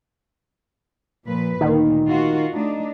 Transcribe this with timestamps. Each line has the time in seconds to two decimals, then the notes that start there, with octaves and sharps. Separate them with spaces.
1.26 A#2 F3 B4
1.61 D2 A#2 D#3
2.07 F4 F#4
2.52 A3 D4 D#4